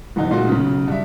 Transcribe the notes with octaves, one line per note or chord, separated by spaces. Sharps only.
F#1 B1 E2 D#4 D#5
A#2 G#3 A3 D#4 F4 F#4
B1 C#3
G2 E5